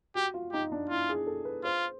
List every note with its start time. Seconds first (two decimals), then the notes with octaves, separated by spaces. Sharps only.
0.15 F#4 G4
0.34 F4
0.52 D#4 G4
0.72 D4
0.90 E4 F4
1.09 G#4
1.27 A4
1.45 B4
1.64 F4 C5